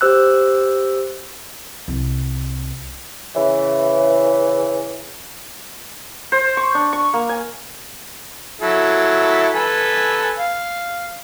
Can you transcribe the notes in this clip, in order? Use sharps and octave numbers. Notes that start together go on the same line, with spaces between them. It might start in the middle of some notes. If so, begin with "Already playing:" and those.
G4 C5 E6 F#6
C2
C#3 E3
C5
C#6
D4
C#6
A#3
G#5
F#3 E4 A4
A4 B4 G#5
F5